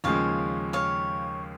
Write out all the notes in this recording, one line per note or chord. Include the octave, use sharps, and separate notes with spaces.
D#2 C#3 F3 G#3 C#5 F5
C#5 F5